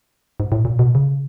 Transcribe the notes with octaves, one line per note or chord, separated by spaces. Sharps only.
G#2
A2
A#2
B2
C#3